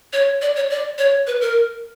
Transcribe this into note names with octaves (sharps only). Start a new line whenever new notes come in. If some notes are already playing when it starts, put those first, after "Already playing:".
C#5
D5
C#5
D5
C#5
B4
A#4